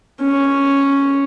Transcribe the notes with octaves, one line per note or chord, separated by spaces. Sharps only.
C#4